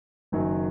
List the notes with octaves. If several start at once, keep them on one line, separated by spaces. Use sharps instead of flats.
F#1 F#2 D#3 F#3